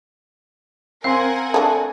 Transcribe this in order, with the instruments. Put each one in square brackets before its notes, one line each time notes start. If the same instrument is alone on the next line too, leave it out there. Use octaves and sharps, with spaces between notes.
[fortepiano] C4 C6 [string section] A#4 F#5 G#5 [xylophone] F5
[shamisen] A3 D4